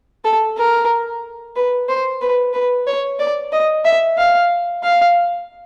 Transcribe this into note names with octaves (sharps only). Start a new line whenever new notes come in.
A4
A#4
B4
C5
B4
B4
C#5
D5
D#5
E5
F5
F5